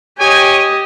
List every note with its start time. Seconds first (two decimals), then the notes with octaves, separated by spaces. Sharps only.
0.18 G4 C#5 D#5 G5 G#5